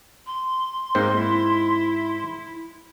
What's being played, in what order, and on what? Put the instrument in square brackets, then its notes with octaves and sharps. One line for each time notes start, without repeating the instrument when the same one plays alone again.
[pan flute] C6
[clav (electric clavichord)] G#2 C4 C5 [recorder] A#3
[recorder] E4